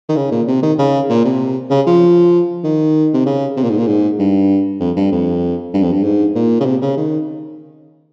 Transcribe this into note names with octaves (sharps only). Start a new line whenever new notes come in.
D#3
C#3
A#2
C3
D#3
C#3
A#2
C3
C#3
F3
D#3
C3
C#3
C3
A#2
G#2
A#2
G#2
G2
F2
G2
F2
G2
F2
G2
G#2
A#2
C#3
C3
C#3
D#3